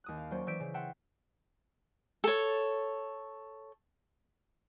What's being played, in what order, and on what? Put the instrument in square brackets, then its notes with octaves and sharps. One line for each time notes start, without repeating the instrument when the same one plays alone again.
[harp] D#2 D#6 F#6
F5
F#3 A#3 C#4 C5 D5
E3 D5 E5 G6 B6 D7
C#3
E5 F#5 G5 A5 C6
[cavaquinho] A4 C#5